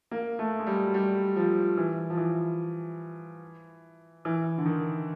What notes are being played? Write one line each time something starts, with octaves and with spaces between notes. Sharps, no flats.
A#3
A3
G#3
G3
F#3
G3
F3
E3
F3
E3
E3
D3
D#3